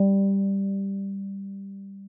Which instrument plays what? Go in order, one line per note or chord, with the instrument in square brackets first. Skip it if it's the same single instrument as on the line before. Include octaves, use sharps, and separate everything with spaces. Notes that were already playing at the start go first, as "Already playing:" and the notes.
Already playing: [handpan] G3